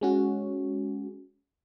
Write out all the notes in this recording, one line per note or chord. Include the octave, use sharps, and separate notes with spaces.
G#3 C#4 F#4